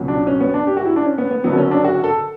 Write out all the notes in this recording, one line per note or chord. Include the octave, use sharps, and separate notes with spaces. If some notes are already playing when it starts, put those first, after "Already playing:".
Already playing: C#2 B2 F#3
D4
C#4
B3
D4
G4
F#4
E4
D4
C#4
B3
B3
F#1 F#2 D3 F#3 B3
C#4
D4
F#4
A4